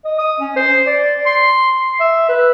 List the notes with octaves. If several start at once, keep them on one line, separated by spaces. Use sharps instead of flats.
D#5
D#6
C#4
C5
D5
C6
E5
B4